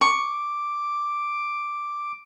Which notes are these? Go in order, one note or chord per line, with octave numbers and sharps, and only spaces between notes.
C#6 D6